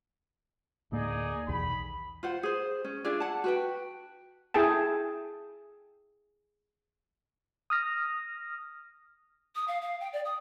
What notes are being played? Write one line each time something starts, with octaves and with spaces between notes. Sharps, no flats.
D2 A2 A#3 D#4 G#4 D5
B1 E2 D#3 B5
F4 C5 F#5
G#4 C5
C#4
D4 F4 G#4 E5
F#5 A5
F#4 B4 G5
E4 G#4 A4 G5 A5
D#6 F6 A#6
D#6
F5
F5
G5
D5
D#6